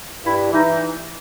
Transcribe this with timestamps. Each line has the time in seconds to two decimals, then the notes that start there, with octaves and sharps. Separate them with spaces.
0.25 G2 E4
0.52 E3 D#4